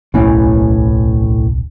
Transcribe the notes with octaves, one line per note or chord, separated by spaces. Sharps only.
D1 B1 A2 E3 C#4